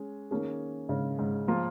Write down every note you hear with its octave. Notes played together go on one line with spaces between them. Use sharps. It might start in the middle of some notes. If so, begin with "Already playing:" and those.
Already playing: G#3 C#4
D#3 A#3 C#4 G#4
G#2 C#3
G#2
F3 A#3 F4 A#4